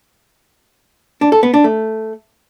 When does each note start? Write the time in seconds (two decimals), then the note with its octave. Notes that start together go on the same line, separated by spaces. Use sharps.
1.21 D4
1.32 A4
1.43 B3
1.54 D4
1.64 A3